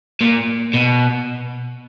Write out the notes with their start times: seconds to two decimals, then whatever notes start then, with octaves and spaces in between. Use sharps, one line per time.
0.21 A#2
0.74 B2